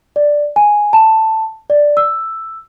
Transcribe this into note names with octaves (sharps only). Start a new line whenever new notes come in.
D5
G#5
A5
D5
E6